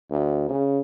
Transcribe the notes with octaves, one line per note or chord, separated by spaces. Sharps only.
D2
C#3